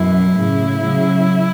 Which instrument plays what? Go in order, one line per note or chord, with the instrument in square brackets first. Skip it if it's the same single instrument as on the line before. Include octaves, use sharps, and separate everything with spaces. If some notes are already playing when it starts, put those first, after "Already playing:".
Already playing: [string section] F#2 B2 [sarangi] E4
[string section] A2 C#3
C#3 F#3